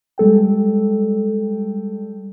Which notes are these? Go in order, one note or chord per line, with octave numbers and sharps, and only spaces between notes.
G3 G#3 A4 G5